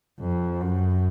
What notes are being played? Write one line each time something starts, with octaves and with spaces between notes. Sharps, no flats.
F2
F#2